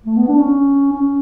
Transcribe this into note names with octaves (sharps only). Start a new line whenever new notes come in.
A3
B3
D4
C#4
C#4